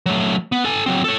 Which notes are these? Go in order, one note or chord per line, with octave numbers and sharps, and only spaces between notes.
F#3 A3
B3
A4 G#5
F#3 C4
A4 C#5